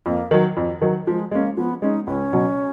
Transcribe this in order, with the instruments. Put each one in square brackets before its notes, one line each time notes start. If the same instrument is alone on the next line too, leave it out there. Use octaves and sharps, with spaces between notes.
[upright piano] F2 [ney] A#3
[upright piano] D#3 F#3
F2
D#3 F#3
[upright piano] F3 [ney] G#3
[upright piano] G#3 C#4 [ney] A#3
[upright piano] F3 [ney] B3
[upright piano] G#3 C#4 [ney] D#4
[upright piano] C#2 [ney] C#4
[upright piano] B2 F#3